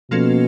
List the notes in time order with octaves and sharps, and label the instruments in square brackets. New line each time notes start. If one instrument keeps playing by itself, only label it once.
[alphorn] B2 [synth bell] F3 A#3 C#4 F4 A4